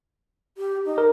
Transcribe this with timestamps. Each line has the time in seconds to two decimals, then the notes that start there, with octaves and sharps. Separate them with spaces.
0.58 G4
0.85 D#4
0.98 A#4